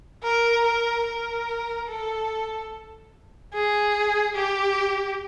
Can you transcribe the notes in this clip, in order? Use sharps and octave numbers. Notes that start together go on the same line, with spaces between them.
A#4
A#4
A#4
A4
G#4
G4